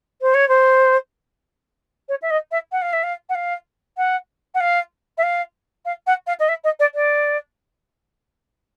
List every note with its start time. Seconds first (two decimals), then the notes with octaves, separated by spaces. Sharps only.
0.21 C5
0.34 C#5
0.48 C5
2.08 C#5
2.22 E5
2.30 D#5
2.51 E5
2.71 F#5
2.81 F5
2.92 E5
3.03 F5
3.29 F#5
3.34 F5
3.97 F#5
4.54 F#5
4.60 F5
5.17 E5
5.23 F5
5.85 F5
6.06 F#5
6.26 F5
6.39 D#5
6.48 E5
6.64 D#5
6.79 D5
6.94 D5